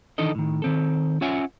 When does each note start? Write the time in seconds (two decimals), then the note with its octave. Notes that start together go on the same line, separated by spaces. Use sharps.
0.18 D#3 E3 D4 D#4 A4 D#5
0.35 A2 D#3
0.62 D#3 C4 A4
1.21 C#4 F4 C#5 E5 F#5 G#5